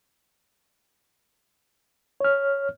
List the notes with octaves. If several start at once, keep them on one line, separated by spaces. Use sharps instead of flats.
C#5 F6